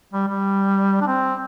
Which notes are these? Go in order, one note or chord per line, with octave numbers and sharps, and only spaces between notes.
G3
G3
D4
C4